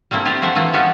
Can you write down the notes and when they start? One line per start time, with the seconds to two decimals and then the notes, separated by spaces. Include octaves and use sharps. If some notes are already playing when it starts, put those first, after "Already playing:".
0.11 G3 A3 A#3 C4 E4
0.25 F4 G4 A#4 C5 D5 E5
0.42 A3 C4 F#4 C5 E5
0.55 E3 A3 A#3 F4
0.73 G3 B3 C#4 F#4 G4 A4